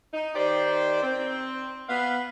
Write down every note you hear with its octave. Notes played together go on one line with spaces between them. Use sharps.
D#4
D#3 G4 C5 D5
C4
B3 F5